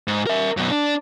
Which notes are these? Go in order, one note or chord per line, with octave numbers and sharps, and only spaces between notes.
G#2
A#4 E5
F#2 B2
D4